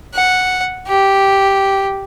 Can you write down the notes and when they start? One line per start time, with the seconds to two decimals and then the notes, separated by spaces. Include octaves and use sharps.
0.14 F#5
0.88 G4